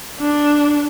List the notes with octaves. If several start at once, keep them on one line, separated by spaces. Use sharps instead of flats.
D4